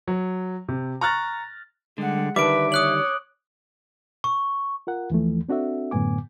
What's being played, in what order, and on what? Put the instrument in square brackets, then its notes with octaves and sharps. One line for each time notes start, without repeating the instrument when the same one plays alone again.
[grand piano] F#3
C3
A#5 C#6 F6 F#6 A6 A#6
[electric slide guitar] D3 G3 [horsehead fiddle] G#3 F#5
[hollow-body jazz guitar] D3 D#3 G3 [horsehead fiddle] B4 [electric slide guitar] E5 [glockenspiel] D6 D7
[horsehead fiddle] C#5 [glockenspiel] D#6 F#6 F#7
[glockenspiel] C#6
[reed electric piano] F4 A#4 F#5
D#2 E3 F3 A3
C4 D4 F#4 A4 E5
F#2 A2 D3 B3 G#5 D6